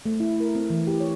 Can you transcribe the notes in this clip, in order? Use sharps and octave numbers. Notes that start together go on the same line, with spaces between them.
A3
E4
A#4
C4
E3
G4
C#5